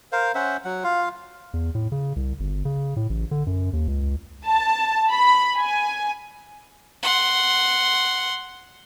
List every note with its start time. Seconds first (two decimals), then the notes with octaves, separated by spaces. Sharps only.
0.12 A#4 C5 F5
0.35 C#4 C5 E5 F#5
0.65 F#3 F#5
0.84 F4 F5
1.54 E2
1.75 A2
1.92 C#3
2.16 C2
2.40 G1
2.65 C#3
2.96 A2
3.10 A1
3.31 D3
3.47 F#2
3.73 D#2
3.88 C#2
4.46 A5
5.10 B5
5.58 G#5
7.03 F#5 C6